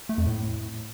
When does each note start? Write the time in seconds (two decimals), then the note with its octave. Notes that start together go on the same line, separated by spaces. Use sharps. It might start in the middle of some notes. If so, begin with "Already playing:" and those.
0.09 A3
0.18 F2
0.26 A2